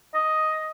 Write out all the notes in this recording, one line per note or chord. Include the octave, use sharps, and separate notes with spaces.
D#5